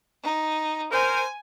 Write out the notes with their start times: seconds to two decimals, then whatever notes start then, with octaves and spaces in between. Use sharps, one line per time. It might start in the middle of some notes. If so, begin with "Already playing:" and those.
0.23 D#4
0.91 A#4 C5 G#5